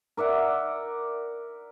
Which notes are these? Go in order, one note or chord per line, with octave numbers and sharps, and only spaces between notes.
A#4 D5 E5 F#5